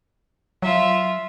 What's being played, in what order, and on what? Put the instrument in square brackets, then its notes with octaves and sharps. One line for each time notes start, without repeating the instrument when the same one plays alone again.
[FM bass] F#3 [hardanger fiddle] F4 E5